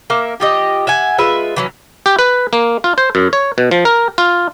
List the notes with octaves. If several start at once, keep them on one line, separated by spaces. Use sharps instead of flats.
A#3 A#4 E5
F3 G4 D#5
E5 F#5 G#5
G#3 F4 B4 E5
E3 F#3 C#4
G4
B4
A#3
F4
C5
F#2
C#5
B2
F3
A#4
F4